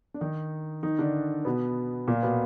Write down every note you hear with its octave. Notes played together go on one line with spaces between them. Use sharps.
D4
D#3 D#4
D#3 D#4
D3 D4
B2 B3
A#2 A#3
B2 B3